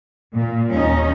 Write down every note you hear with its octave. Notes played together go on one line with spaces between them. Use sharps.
A#2
D#2 C#4 D#4